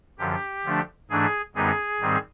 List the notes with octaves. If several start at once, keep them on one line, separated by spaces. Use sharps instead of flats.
F#2 D3 F3 G4
D3 F3 A3 D4
G#2 E3 A3 D4 G#4
F#2 D3 G3 B3 D#4 G#4
G#2 D#3 G3 C4